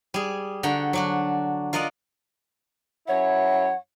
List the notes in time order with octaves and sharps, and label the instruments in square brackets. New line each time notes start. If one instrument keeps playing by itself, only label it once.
[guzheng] G3 G#4
D3 F#4 G5 A#5
F#3 D4 F#4
F4 A#4 D5 D#5 F#5
[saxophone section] F#2 E4 C#5 [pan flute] F#5